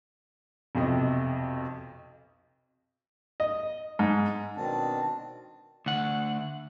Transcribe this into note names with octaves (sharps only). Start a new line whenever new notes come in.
B1 F2 C3 D#5
D#5
G#2
B2 D#3 C4 D4 A5
D2 F#5